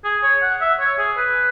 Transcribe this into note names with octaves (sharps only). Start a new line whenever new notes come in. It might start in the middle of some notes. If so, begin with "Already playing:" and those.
G#4
C#5
F#5
E5
C#5
G#4
B4